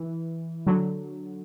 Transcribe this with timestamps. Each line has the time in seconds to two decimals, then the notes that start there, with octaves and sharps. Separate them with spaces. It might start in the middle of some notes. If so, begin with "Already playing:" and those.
Already playing: E3
0.67 D3 F#3